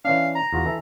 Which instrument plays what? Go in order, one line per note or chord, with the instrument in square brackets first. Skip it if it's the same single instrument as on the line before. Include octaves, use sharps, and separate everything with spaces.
[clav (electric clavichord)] E3 C#4 D4 [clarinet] F5
[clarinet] A#5
[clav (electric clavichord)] E2 F4 F#4
E3 A4 E5